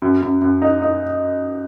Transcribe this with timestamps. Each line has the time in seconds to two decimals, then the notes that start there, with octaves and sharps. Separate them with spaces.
0.02 F#2
0.22 F#2
0.41 F#2
0.62 D#4
0.82 D#4